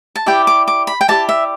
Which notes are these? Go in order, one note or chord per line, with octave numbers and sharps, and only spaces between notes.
A5
E4 G4 D5 G5
D6
D6
B5
G5
E4 G4 D5 A5
E5